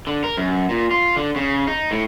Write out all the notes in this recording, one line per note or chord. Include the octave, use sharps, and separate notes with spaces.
D3
A#4
F#2
A#2
F4
D3
C#3
D#4
A2